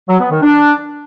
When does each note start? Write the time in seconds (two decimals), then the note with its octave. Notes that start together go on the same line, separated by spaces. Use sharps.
0.08 F#3
0.19 B3
0.31 D#3
0.42 D4